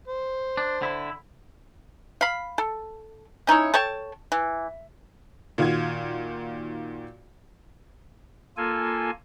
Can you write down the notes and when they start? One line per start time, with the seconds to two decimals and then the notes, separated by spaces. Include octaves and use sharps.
0.08 C5
0.57 D4
0.82 D3 E4
2.21 F5 B5
2.58 A4
3.47 C#4 D#4 E4 C#5
3.74 A4 C#5 G5 A5
4.32 E3
5.58 A#2 D#3 F4 F#4 G#6
8.57 A#3 F4 A4 G#5